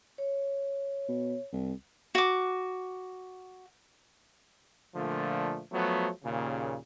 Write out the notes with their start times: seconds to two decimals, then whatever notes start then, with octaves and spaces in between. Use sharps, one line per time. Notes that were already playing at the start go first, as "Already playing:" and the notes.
0.18 C#5
1.09 B2
1.53 C2
2.15 F#4 D6
4.95 A#2 D3 F3 A3
5.72 F3 F#3 A3 B3
6.24 D#2 A#2 C#3